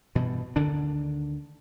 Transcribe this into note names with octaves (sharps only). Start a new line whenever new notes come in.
G2 B2 E3
D2 D3 D#3 D4